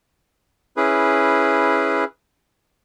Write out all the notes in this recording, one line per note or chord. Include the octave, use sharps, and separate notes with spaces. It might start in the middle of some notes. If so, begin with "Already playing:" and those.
C#4 E4 G#4 B4